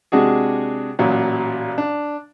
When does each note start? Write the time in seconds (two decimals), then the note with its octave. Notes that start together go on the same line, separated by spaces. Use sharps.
0.12 C3 G#3 D4 F#4 G#4
0.99 A1 A#2 F#3
1.78 D4